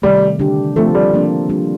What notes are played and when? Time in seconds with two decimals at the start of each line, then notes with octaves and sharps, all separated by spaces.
0.02 C3 D#3 G3 A3
0.39 D3 G3 D4 G4
0.76 F3 A3 C4 F4 A4
0.95 G3
1.13 F3 A#3 D4
1.49 G3 A#3 D4 F4